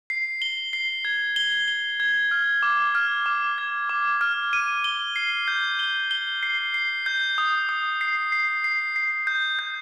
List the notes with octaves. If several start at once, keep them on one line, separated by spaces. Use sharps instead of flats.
C7
G7
C7
G#6
G7
G7
G#6
F6
D6
F6
D6
G#6
D6
F6
D#7
G7
C7
G6
G7
G7
C7
C7
G6
D#6
D#6
C7
C7
C7
C7
G6
G6